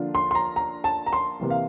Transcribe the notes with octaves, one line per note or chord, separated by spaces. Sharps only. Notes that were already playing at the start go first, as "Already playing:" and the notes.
Already playing: D3 F3 A#3 D4 F4
C6
C6
A#5
A#5
A5
A#5
C6
C3 E3 A#3
F5